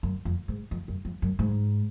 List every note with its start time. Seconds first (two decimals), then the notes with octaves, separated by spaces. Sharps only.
0.03 F#2
0.25 F2
0.48 G#2
0.71 F2
0.88 F#2
1.05 F2
1.22 F#2
1.39 G#2